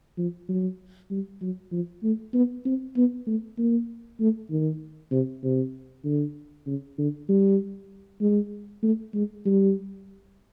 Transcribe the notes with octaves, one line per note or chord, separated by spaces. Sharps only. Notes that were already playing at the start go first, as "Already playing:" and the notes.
F3
F#3
G3
F#3
F3
A3
B3
C4
B3
A3
A#3
A3
D#3
C3
C3
D3
C#3
D3
G3
G#3
A3
G#3
G3